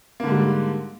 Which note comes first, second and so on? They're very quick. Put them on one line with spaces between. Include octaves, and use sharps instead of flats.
A#3 D3 G#2 G3